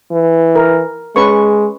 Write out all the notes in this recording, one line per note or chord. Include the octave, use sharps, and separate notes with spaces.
E3
A#4
G#3 C#4 B4 C#6